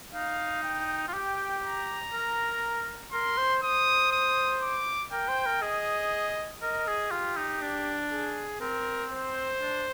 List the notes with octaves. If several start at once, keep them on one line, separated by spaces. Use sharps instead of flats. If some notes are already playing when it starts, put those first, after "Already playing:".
D#4 F5
G5
F4
G4 G5
A#5
A#4
A#4 C6
C5
C5 D#6
D#6
D6
A#4 G5
C5
A#4
G#4 D#5
A#4 D#5
G#4
F4 G4
D#4
D4
G#4
C4 A#4
C5
D4